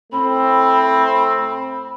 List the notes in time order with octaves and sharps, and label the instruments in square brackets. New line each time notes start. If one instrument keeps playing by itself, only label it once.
[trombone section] A2 A3 C4 [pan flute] B5